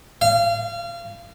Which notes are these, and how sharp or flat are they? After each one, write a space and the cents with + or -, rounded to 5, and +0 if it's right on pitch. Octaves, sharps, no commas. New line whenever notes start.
F5 -30